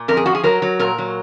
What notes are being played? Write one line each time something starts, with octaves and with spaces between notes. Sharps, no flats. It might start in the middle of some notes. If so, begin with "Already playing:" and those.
Already playing: A#2
F2 A#4
G#4
F3 F#4
G#4
F#3 A#4
F#3
A#2 A#4
F#3